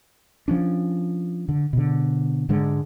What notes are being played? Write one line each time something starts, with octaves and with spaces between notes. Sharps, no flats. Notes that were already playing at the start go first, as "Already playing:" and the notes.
F3 C#4 D4
D3
B2 D3
G#2 D3 G#3